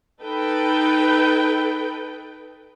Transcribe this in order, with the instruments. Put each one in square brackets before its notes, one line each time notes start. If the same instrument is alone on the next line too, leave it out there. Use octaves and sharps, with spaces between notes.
[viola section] D#4 A4 B4 G5